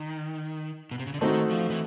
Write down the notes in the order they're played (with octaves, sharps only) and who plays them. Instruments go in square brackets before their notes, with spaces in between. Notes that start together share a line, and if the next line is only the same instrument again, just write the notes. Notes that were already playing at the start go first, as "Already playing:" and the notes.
Already playing: [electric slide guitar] D#3
B2
C3
C#3
D3
[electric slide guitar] D#3 [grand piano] A3 C4 D#4 F#4
[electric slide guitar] F3
E3